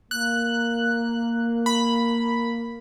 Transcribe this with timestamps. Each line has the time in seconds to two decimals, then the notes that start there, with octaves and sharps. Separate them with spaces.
0.11 A#3 F#6
1.66 B5